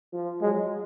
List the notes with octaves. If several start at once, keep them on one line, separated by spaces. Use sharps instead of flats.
F3
F#3 G#3